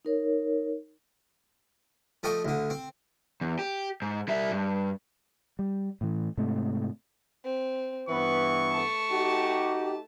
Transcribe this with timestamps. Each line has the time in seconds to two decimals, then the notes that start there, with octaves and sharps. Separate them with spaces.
0.05 D#4 A#4 C#5
2.23 F3 A3 D#5 G5 C#6
2.45 D2 D3
2.70 C4
3.41 E2
3.59 G4
4.02 G#2
4.28 G3 E5
4.52 G2
5.59 G3
6.01 A2 E3
6.37 G#2 C3 A3
7.44 C4
8.09 G2 E3 B3 B4 C#6
8.71 A3 A5
9.11 D#4 F#4 G4